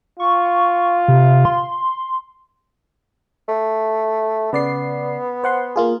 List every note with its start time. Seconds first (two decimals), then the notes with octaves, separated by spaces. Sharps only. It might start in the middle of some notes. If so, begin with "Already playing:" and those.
0.20 F4 C#6
1.08 C3
1.45 C6
3.48 A3
4.53 C#3 B3 D5 C7
5.44 C5 F#5 C6
5.76 A#3 F4 G#4